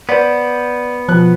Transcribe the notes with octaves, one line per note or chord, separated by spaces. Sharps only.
B3 C5 D5
B2 F3 F#6